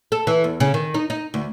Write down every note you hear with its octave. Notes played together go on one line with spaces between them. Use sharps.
A4
E3
E2
C#3
D#3
D#4
D#4
D2